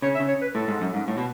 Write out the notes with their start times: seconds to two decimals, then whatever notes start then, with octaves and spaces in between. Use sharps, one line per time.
0.02 C#3 C#5
0.15 E5
0.20 C#3
0.28 C#5
0.41 B4
0.54 A2 A4
0.68 G#2
0.81 F#2
0.94 G#2
1.08 A2
1.18 B2